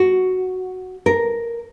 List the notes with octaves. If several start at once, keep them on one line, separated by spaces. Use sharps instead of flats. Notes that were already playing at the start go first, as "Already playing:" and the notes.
Already playing: F#4
A#4